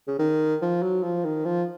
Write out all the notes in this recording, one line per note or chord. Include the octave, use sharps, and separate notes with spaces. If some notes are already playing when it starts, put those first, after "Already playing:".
C#3
D#3
F3
F#3
F3
D#3
F3